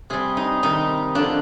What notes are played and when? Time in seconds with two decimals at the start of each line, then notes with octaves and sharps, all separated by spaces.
0.10 C3 G3 G#4
0.37 D#4
0.63 C3 D#3 G3 D#4
1.15 D3 F3 D4